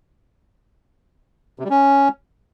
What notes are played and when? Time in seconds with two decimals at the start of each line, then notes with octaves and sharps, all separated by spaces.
1.59 C3
1.65 G3
1.70 C#4